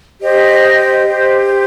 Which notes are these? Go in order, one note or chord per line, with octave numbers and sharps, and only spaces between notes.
G4 C5 D#5
G4 C5